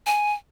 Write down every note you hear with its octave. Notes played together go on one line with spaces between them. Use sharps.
G#5